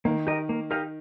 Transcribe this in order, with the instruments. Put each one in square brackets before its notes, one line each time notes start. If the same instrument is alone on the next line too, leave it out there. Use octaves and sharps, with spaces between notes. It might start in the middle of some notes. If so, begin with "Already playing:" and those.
[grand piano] D#3 [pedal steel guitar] A#3
[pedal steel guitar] G4 A#4 D#5
A#3
D#4 G4 A#4 F5